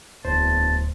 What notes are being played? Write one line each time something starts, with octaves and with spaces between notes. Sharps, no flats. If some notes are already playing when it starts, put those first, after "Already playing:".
D1 E2 C5 A5